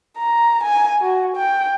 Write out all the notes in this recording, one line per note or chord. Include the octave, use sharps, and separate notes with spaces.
A#5
G#5
F#4
G5